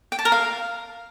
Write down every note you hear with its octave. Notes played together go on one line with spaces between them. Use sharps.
G5
A5
A#4
F5